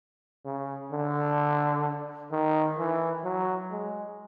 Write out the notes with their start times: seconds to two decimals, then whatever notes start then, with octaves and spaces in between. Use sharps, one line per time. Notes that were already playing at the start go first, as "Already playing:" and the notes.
0.45 C#3
0.92 D3
2.32 D#3
2.78 E3
3.24 F#3
3.71 G#3